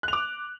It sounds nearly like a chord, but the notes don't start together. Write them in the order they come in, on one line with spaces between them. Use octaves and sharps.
F#6 F7 D6